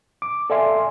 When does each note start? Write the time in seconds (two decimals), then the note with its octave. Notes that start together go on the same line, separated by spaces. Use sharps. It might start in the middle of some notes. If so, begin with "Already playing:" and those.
0.22 D6
0.50 A4 D5 E5 F5 G#5 C6